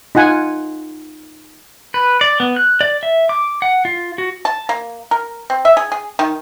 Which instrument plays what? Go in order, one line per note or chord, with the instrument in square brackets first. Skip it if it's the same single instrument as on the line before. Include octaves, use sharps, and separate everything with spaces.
[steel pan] D#4 F4 F#5 G#5
[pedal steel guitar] B4
D5
B3
F#6
D5
E5
D6
F#5
F4
F#4
[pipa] A5
A#3
A#4
C4
E5
G#4
G#4
D#3